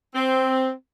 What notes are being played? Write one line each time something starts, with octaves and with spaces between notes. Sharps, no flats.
C4